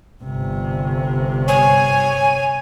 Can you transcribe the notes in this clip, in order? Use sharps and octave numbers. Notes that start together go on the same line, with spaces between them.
G1 C3
C#5 G#5